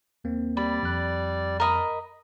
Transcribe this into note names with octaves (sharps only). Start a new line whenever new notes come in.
D#2 A#3 C4
G3 D5 B5
F2 F#6
A#4 D#5 B5